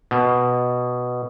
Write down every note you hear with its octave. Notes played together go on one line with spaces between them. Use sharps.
B2